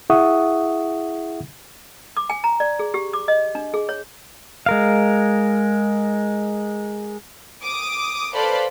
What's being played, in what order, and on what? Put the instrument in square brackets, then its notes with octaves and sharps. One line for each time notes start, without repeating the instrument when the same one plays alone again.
[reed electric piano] E4 G#4 E5 F#5 C#6 D#6
[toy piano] D6
G#5
A#5
D5
G#4
G4
D6
D#5
D4
G#4
C#5
[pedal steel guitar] G#3 A#4 F5
[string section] D6 D#6
A4 B4 C5 D5 F5 B5